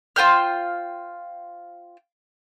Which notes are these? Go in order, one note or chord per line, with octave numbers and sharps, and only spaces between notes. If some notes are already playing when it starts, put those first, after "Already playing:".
F4 C5 G5 F6